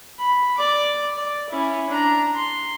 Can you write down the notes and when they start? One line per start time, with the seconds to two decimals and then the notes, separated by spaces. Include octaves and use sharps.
0.19 B5
0.58 D5 D6
1.17 D5
1.49 C#4 E4
1.90 D4 A#5
2.35 C6